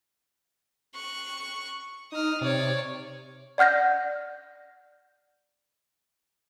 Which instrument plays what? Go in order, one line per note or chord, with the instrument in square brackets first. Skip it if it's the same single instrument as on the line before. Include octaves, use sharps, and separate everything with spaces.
[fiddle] C#6 F#6
[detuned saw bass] D#4 [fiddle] D#6 F6
[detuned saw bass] C3 [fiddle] C#5 D5
[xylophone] D5 F#5 F6 G6 A#6